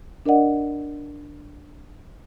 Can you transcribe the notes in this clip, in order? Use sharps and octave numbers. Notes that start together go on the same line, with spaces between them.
D4 A#4 D5 D#5 F#5